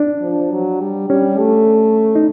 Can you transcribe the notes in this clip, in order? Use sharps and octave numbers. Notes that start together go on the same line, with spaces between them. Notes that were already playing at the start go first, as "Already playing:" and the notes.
Already playing: D4
F3
F#3
G3
G3 C#4
A3
D#4